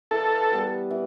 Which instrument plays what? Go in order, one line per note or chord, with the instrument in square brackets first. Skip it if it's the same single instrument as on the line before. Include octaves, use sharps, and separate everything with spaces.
[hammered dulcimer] E3 [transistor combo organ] A4
[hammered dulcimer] G3 B3
E3